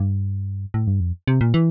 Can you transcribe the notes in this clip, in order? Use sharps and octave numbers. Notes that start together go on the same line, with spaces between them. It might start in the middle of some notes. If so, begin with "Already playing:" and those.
Already playing: G2
A2
G2
F2
C3
A#2
E3